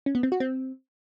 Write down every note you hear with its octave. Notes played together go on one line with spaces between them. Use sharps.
C#4
B3
C4
F#4
C4